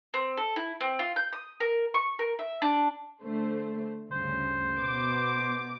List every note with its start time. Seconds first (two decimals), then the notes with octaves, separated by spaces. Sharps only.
0.14 C4
0.37 A4
0.56 E4
0.81 C4
0.99 F4
1.16 G6
1.33 D#6
1.60 A#4
1.94 C#6
2.19 A#4
2.39 E5
2.62 D4
3.23 D3 A3 C5
4.11 D2 G2 C#3 C5
4.78 B2 B3 D6